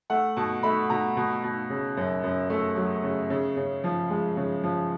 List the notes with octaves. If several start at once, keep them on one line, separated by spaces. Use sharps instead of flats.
A3 F#5
B2 A5
A3 B5
B2 A#5
B2
B2
C#3
F#2
F#2
A3
F#3
C#3
C#3
C#3
F3
G#3
C#3
F3